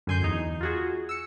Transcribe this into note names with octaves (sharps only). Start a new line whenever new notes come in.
F#2 D3 G#5 C6 G6
E2 D#4
F4 F#4 G#4
E6 C#7